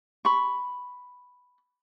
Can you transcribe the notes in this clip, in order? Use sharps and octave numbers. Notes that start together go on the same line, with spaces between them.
B5 C#6